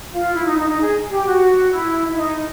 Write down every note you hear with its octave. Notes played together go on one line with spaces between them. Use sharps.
F4
E4
D#4
D#4
D#4
G#4
G4
F#4
E4
E4
D#4